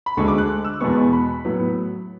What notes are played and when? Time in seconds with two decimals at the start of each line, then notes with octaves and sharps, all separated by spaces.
0.06 B5
0.17 D2 D3 G#3 C#6
0.28 D6
0.38 F#6
0.65 E6
0.80 E2 B2 G#3 B3 C#6
1.13 B5
1.45 A2 F#3 B3